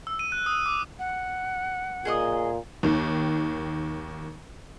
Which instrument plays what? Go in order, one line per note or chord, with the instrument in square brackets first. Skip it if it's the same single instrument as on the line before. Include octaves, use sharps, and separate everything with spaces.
[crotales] E6
D#7
F#6
D#6
D6
[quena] F#5
[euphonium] A#2 [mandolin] G#4 D#5 D#6
[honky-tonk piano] D#2 D#3